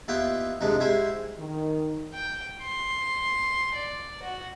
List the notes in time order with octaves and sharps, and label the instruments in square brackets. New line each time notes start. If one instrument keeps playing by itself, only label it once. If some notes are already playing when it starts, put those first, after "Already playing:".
[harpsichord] D#2 B3 E4 F4 B4 G5
F2 C3 D#3 G#3 D4
G#2 E4 G4 C5 G#5
[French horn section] D#3
[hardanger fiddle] G5
C6
D5
F#4